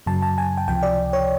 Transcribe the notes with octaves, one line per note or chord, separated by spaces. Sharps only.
F#2 C#3 F#3 A5
A5
G#5
G5
C#2 C3 F3 G5
D5
C#5